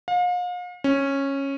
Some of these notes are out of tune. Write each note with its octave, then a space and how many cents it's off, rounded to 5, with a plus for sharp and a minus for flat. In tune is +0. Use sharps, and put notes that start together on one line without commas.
F5 +40
C#4 -10